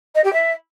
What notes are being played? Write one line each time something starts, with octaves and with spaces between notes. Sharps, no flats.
D#5
G4
E5